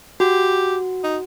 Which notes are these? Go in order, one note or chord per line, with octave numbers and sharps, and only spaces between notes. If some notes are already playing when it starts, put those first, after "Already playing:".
F#4 G4
D#4